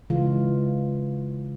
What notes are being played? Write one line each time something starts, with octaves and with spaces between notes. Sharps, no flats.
C#3 E3 G#3 F4